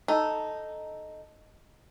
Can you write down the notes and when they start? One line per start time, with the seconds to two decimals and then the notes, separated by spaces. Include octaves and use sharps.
0.08 D#4 A4